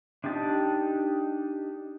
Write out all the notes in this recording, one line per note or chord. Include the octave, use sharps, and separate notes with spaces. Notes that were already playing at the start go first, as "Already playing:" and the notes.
D4 D#4 G4 A5